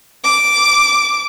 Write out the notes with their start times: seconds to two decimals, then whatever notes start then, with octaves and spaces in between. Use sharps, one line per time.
0.24 D6